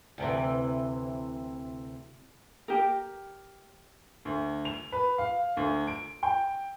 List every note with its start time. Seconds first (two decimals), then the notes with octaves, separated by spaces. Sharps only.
0.18 D2 C3 E3
2.68 G4 A#4
4.25 D2
4.65 F7
4.92 B4
5.18 F5
5.57 D2
5.87 D7
6.23 G5